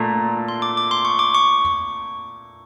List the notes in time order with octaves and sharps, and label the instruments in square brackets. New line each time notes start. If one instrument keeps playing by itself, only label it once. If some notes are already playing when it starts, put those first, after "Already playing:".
Already playing: [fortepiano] A#2 A3 [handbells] A#5
[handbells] C6
D6
D6
C6
C#6
D6
C#6